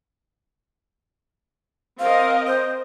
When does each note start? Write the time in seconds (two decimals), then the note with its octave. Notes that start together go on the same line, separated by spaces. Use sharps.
1.99 C4 A#4 D#5 F5
2.47 C5